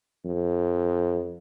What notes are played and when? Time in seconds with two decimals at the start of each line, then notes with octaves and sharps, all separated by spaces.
0.25 F2